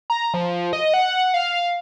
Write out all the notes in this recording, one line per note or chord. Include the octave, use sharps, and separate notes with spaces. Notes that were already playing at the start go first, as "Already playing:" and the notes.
A#5
F3
D#5
F#5
F5